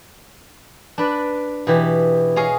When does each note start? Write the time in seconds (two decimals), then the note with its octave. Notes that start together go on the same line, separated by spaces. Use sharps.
0.98 D4 B4 D5
1.67 B2 E3 G4
2.36 G#4 C#5 D#5 F5